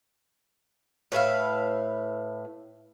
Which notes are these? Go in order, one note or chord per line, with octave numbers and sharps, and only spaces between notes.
A2 B4 E5 F5